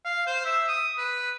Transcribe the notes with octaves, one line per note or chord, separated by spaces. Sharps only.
F5
C5
E5
D#6
B4